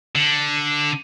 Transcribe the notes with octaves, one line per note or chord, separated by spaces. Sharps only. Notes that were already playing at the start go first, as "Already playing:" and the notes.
D3